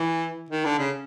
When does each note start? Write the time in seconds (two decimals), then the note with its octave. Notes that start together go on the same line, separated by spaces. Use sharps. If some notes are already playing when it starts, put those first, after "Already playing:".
Already playing: E3
0.51 D#3
0.65 D3
0.78 C#3